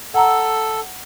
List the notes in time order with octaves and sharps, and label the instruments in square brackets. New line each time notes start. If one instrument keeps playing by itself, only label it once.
[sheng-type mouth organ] A4 [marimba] F#5 A#5 E6